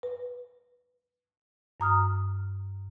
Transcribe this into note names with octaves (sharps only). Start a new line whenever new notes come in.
B4
G2 A#5 D#6 F6